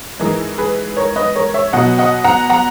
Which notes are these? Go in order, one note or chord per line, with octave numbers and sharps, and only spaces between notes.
G#2 E3 G#3 A#4
G#4 B4
A#4 C#5
B4 D#5
A#4 C#5
C#5 E5
B2 F#3 D#5 F#5
D#5 F#5
F#5 A#5
F#5 A#5